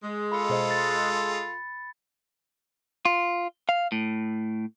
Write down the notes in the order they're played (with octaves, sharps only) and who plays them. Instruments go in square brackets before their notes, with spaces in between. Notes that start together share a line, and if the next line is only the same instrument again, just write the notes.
[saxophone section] G#3
[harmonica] F4 A4 [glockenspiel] B5 C#7
[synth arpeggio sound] B2 C5 D#5
[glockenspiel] A6
[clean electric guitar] F4
F5
A2